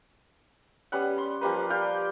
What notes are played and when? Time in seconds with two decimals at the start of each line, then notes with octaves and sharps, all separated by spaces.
0.92 G3 B3 C#4 F#5
1.18 C6
1.41 F3 G3 A#3 B4
1.70 D5 F5 G5 D6